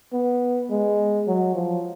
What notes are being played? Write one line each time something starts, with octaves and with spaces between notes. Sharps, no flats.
B3
G#3
F#3
F3